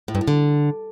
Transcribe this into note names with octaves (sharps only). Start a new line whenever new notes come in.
A2
G2
A2
D3